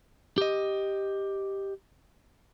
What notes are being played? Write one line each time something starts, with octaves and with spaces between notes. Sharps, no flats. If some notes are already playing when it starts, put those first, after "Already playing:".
G4 D#5